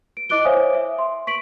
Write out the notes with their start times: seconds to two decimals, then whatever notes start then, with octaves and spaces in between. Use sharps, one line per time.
0.17 D7
0.29 E4 D#5 D6 F#6 D7 G7
0.45 C5 C#5 E5 F5 G#5 D#6
0.75 E5
0.99 C6
1.27 C#6 B6 D7 F#7